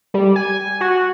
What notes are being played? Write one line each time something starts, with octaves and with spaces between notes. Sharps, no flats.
G3
G#5
F#4